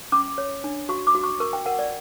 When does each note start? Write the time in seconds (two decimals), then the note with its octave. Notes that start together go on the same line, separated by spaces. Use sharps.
0.12 C#4 D6
0.38 C#5
0.64 D4
0.89 F#4 C#6
1.07 D6
1.15 F#4
1.24 C#6
1.40 A#4 C#6
1.53 G5
1.66 A#4 F#5
1.79 D5